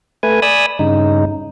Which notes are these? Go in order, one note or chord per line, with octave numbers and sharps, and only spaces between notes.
A3 B4 G#5
D5 G#5 B5 D#6 E6
G2 C#3 D#4